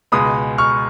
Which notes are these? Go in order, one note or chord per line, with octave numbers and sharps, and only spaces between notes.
C#2 B2 G#3 B3 B5 D#6
C#6 F6